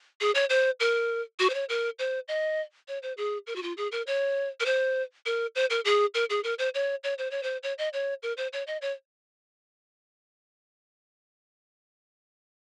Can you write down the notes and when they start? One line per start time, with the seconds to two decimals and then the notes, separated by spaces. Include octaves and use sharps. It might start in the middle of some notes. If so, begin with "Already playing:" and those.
0.21 G#4
0.35 C#5
0.50 C5
0.80 A#4
1.39 F#4
1.50 C5
1.54 C#5
1.69 A#4
1.99 C5
2.28 D#5
2.88 C#5
3.02 C5
3.17 G#4
3.47 A#4
3.56 F#4
3.63 F4
3.77 G#4
3.92 A#4
4.07 C#5
4.60 A#4
4.65 C5
5.26 A#4
5.55 C5
5.70 A#4
5.85 G#4
6.14 A#4
6.30 G#4
6.44 A#4
6.59 C5
6.74 C#5
7.04 C#5
7.18 C5
7.31 C#5
7.43 C5
7.63 C#5
7.78 D#5
7.93 C#5
8.23 A#4
8.37 C5
8.53 C#5
8.67 D#5
8.82 C#5